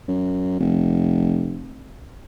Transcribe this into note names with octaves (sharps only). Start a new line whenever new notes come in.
F#2
F1